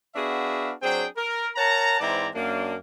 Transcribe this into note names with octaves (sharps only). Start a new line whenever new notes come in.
B3 D4 F#4 G#4 E5 F5
F#3 C4 D4 G#4 G5
A#4
A#4 C#5 F#5 A5 A#5
G#2 E3 C4 E4 D5 A#5
F#2 A#3 D4